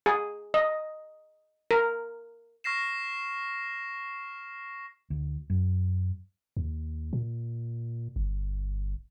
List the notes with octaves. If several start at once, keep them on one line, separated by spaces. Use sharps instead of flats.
G#4
D#5
A#4
C#6 F6 A#6 C7 E7
D2
F#2
D#2
A#2
G1